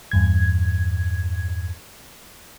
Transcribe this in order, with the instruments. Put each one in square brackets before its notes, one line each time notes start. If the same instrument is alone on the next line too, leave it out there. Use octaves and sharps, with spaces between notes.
[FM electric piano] E2 G2 G#6